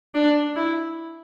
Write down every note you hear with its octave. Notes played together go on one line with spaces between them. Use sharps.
D4
E4